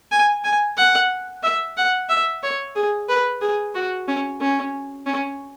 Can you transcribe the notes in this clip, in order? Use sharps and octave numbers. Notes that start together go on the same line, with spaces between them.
G#5
G#5
F#5
E5
F#5
E5
C#5
G#4
B4
G#4
F#4
C#4
C#4
C#4